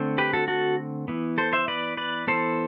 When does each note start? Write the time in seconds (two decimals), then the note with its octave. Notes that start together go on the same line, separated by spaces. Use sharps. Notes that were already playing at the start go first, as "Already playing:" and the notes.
Already playing: D3 A3 C4
0.18 G4 B4
0.33 F#4 A4
0.48 F#4 A4
1.08 E3 B3
1.38 A4 C5
1.53 C5 E5
1.68 B4 D5
1.97 B4 D5
2.27 E3 B3 A4 C5